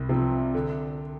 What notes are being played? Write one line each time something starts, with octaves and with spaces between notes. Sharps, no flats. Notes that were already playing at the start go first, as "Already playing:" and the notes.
Already playing: C2
C3 F3
D3